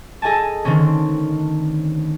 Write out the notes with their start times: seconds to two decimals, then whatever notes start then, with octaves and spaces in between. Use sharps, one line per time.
0.22 G#4 A4 D#5 G#5 A5
0.65 D3 D#3 A3 C4 C#4